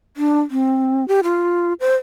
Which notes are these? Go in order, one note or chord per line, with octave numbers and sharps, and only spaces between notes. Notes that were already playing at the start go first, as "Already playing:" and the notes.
D4
C4
G4
F4
C5